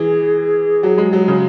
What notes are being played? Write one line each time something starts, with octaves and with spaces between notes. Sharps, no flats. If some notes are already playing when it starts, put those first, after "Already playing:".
Already playing: E3 G#4
F#3
G#3
F#3
C#3